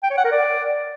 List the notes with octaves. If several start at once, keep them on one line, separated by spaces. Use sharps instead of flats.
G5
C#5
F#5
A#4
D5